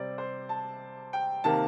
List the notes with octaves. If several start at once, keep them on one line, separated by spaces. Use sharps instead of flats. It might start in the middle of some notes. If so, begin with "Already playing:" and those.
Already playing: C3 G3 C4 D5
C5
A5
G5
C3 D#3 A#3 A5